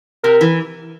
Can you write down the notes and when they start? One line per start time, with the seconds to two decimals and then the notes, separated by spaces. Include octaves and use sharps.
0.24 C3 A#4
0.41 E3